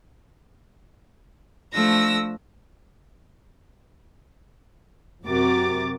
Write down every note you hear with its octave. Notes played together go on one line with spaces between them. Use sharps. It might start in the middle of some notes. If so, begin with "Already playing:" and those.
F3 A3 D4 E6 A#6
F#2 C3 F#4 A#4 D6 A6